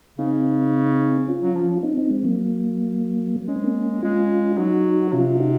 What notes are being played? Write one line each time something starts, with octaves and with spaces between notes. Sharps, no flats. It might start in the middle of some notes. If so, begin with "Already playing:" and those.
C#3 C4 D#4
C#4 F4
F#3
F3
C4 D#4
C4 D#4
G#3 C4
F#3 A#3
G#3 C#4
C4
A#3 C#4
G#3 C#4 F4
F#3 D#4 F#4
C3 C#4 F4
D#4 F#4